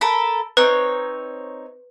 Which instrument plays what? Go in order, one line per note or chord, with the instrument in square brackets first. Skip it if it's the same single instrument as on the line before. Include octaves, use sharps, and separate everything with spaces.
[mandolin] A4 A#4 B5
[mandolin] C4 D#4 C#5 [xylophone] B4